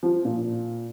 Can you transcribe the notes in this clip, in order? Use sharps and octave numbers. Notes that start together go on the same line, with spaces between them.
F3
A#2